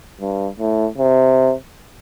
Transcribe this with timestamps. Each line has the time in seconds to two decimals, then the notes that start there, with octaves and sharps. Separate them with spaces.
0.20 G2
0.59 A2
0.98 C3